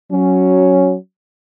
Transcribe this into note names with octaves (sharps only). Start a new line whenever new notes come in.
F#3 C#4